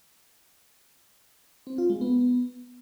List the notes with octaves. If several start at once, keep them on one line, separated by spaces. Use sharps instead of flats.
C4
F4
G#3
B3